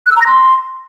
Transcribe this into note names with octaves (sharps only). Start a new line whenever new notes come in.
F#6
E6
A#5
A#6
C6